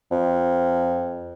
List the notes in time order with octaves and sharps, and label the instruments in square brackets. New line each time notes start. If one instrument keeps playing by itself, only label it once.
[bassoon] F2